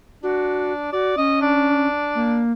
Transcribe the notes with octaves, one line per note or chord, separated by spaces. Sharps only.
D4 F#4
F#4 D5
C#4 D#5
D4
A#3